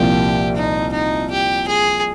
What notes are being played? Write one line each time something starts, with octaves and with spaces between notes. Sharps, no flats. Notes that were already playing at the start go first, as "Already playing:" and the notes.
Already playing: C2 A#2 F3 A#3 F4 G4
D#4
D#4
G4
G#4